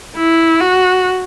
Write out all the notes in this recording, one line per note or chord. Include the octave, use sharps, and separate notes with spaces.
E4
F#4